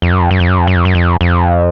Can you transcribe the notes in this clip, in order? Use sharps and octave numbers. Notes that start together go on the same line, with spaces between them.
F2
F#2
F2
F#2
F2
F#2
F2
F#2
F2
F#2
F2
F2